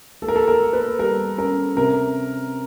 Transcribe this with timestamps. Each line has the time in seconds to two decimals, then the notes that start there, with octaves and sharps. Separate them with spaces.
0.22 A#3 A4
0.28 A#4
0.36 A4
0.48 A#4
0.61 A#3
0.73 B4
0.99 G3 A#4
1.38 C#4 A#4
1.76 C3 A#4